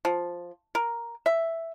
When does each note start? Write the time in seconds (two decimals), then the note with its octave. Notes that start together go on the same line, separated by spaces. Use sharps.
0.05 F3
0.75 A#4
1.26 E5